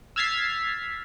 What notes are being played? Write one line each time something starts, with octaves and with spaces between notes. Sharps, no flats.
E6 F6 G#6 A6 B6 C7